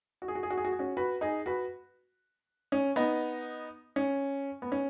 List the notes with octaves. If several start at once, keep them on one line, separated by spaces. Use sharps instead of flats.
F#4
G#4
F#4
G#4
F#4
G#4
F#4
G#4
C#4 F#4
F#4 B4
D#4 G#4
F#4 B4
C#4
B3 D#4
C#4
B3
C#4